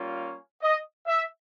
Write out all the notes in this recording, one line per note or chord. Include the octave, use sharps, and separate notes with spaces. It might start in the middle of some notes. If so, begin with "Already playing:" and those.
Already playing: G3 A#3 C#4 F4
D#5
E5